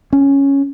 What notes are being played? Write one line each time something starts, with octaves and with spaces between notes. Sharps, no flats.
C#4